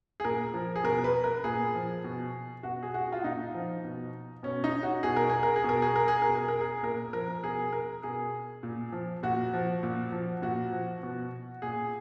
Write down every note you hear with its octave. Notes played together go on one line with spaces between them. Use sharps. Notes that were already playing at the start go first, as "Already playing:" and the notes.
G#4
A#2 A#4
F3
G#4
B2 A#4
B4
A#4
A#2 G#4
F3
B2
B2 F#4
G#4
F#4
F4
A#2 D#4
F3
B2
B2 C#4
D#4
F#4
B2 G#4
A#4
G#4
A#4
G#4
B2 A#4
G#4
A#4
G#4
B2 A#4
G#4
A#4
G#4
A#2 A#4
F3 A#4
B2 G#4
A#4
B2 G#4
A#2
F3
A#2 F#4
F3
A#2
F3
A#2 F#4
F3
B2
A#2 G#4